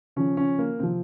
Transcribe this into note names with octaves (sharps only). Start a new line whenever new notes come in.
C#3 F3 C#4
C#4
A#3
C3 F3 C4